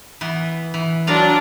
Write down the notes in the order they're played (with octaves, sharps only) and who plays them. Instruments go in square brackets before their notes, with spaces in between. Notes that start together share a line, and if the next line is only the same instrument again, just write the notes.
[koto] E3 B3
E3
[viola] F#3 D4 [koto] F4 D5 A#5